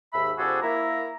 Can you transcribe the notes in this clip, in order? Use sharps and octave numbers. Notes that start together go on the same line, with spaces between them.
D#2 G#2 E5 B5
C3 F3 D4 F#4 G#4 A4
A#3 E4 A#5